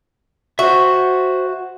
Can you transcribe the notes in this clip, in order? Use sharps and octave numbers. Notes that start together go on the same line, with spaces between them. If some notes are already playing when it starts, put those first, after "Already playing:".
F#4 C5 E5